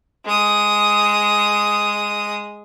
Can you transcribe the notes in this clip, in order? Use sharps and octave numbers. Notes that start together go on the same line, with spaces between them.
G#3 D#6